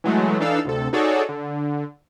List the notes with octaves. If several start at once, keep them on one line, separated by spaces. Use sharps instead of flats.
E3 F#3 G#3 A3
E3 D4 D#4 A4 F5 E6
D2 C3 A4
D#4 F#4 G#4 A4 C#5 D5
D3